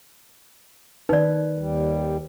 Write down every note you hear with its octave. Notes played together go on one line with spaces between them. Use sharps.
D#3 D#4 B4 D5
D#2 G3